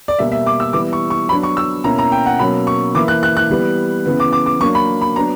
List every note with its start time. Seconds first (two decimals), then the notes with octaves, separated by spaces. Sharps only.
0.08 D5
0.19 B2 G3 A#3 E5
0.32 E5
0.46 D6
0.60 E6
0.73 E3 G3 B3 E4 D6
0.93 C#6
1.10 C#6
1.29 F#3 B3 D4 B5
1.43 C#6
1.57 E6
1.84 B2 A#3 C#4 E4 A#5
1.99 A#5
2.12 G5
2.26 F#5
2.39 B2 F#3 A#3 C#4 B5
2.67 C#6
2.95 E3 A#3 E4 D6
3.08 F#6
3.23 F#6
3.37 F#6
3.50 E3 G3 B3
4.06 C#3 E3 B3
4.20 D6
4.33 D6
4.46 D6
4.60 F#3 A#3 D4 C#6
4.75 B5
5.01 B5
5.16 F#3 B3 D4 A#5